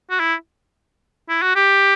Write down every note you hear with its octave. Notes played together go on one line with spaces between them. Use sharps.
F#4
E4
E4
F#4
G4